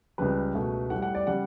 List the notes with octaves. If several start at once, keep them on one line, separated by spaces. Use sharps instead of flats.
C#2 C#3 G3 B4
C#2 B2 A3
A2 G3 F#5
F#5
D5
C#3 G3 F#5